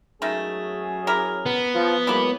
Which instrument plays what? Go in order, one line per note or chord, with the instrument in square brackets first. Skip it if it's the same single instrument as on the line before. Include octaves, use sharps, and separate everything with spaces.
[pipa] D#3 G#3 A3 [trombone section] F#3 C#4 G#4
[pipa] E4 G4 A#4
[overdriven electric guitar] B3
[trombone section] F3
[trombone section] F#3 G#3 A#3 [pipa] E4 G4 B4